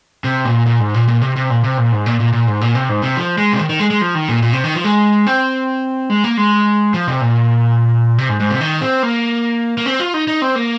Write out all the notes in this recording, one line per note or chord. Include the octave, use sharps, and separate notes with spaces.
C3
A#2
A#2
G#2
A#2
A#2
C3
C3
A#2
C3
A#2
G#2
A#2
A#2
A#2
G#2
A#2
C3
G#2
C3
F3
G#3
C3
D#3
D#3
G#3
G#3
F3
D#3
A#2
A#2
C3
D#3
F3
G#3
C4
G#3
A#3
G#3
F3
C3
A#2
C3
G#2
G#2
C3
D#3
C4
A#3
A#3
C4
F4
D#4
D#4
C4
A#3